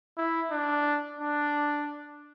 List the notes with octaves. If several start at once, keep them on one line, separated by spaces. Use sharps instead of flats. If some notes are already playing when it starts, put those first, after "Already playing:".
E4
D4
D4